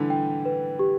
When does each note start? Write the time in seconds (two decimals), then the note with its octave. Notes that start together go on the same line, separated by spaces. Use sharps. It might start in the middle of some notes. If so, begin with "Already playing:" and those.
Already playing: D3 E3 G3 A3 D4
0.10 G5
0.45 B4
0.79 G4